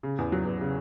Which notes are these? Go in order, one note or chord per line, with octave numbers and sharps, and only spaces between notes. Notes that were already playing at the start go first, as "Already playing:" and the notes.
C#3
E2
F#3
E2
C#3